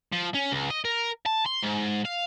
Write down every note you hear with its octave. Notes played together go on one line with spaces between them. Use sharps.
F3
C#4
C#2
D#5
A#4
A5
C6
G#2
F5